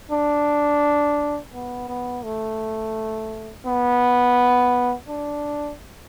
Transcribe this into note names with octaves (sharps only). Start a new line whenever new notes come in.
D4
B3
B3
A3
B3
D4